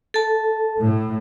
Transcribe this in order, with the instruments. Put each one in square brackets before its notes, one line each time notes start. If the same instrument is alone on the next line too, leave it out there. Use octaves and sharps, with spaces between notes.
[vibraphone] A4 A5
[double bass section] A2